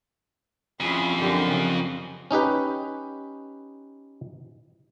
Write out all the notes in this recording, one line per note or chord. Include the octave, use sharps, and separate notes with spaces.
F2 C#4 E4 G#4
F#2 D3 G4
C#3
C#4 D#4 G4 B4